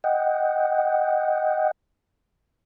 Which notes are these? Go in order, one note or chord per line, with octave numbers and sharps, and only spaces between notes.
D#5 F#5 G5